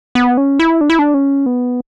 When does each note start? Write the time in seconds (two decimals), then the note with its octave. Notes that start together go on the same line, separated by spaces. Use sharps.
0.15 B3
0.37 C#4
0.59 E4
0.81 D4
0.90 E4
0.99 D4
1.14 C#4
1.46 B3